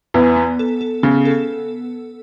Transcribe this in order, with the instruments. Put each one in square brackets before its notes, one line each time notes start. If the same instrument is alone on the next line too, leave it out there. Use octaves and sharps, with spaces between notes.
[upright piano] E2 E3 [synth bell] B3
[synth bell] B3
A4
A4
[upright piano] C#3 [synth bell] B3
[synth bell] A4